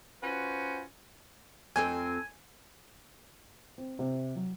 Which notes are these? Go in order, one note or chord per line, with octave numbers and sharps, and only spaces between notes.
C#4 F4 F#4 B4 C5
F2 C4 A4 G#5
C4
C3
F#3